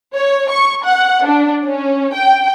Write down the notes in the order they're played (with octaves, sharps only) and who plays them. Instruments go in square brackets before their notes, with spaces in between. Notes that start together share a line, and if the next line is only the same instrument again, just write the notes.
[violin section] C#5
C#6
F#5
D4
C#4
G5